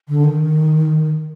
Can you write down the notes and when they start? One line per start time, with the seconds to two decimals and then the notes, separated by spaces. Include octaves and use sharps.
0.09 D3
0.24 D#3